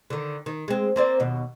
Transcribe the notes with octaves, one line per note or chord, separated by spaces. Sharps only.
D3 D#3
D#3
G#3 C4
A#3 C4 D5
D#2 B2